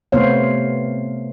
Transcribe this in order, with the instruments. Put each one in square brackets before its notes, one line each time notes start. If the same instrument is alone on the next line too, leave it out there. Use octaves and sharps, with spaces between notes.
[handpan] C3 A3 B3 C5 C#5 F5